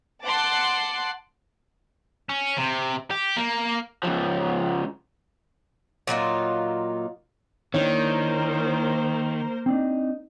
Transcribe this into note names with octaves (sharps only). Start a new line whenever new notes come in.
F#5 A5 C6 D6 F#6
C#4
C3
G4
A#3
C#2 F3
A#2 F#3 D#4 F4
D#3 A#3 D4 E4 A#4 C5 C#5
C4 D4 D#4